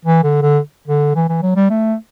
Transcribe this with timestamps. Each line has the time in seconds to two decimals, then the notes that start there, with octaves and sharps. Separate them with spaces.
0.05 E3
0.24 D3
0.42 D3
0.88 D3
1.15 E3
1.29 E3
1.42 F#3
1.56 G3
1.70 A3